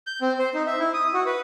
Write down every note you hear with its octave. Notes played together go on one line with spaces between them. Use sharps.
G6
C4
C5
D#4
E5
E4
D#6
F#4
B4